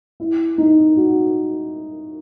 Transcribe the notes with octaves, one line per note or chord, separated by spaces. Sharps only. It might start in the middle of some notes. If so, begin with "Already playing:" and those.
E4
D#4
F#4